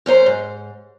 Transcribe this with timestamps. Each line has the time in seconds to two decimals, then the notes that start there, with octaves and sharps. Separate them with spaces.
0.06 F#2 C#4 C5 A#5
0.26 G#2